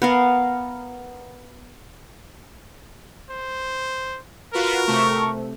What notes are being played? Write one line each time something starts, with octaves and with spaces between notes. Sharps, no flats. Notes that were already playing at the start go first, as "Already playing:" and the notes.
B3 A#4 F5
C5
F4 F#4 A#4 B4
C3 A3 C#6